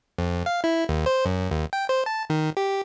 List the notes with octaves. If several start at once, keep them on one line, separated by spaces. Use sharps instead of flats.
F2
F5
E4
D#2
C5
F#2
D#2
G5
C5
A5
D#3
G4